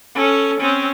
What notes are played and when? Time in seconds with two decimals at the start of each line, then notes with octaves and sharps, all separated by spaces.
0.15 C#4 A4
0.60 C4 C#4